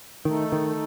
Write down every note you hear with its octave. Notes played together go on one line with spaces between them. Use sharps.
D#3 A3 D#4 A4
D#3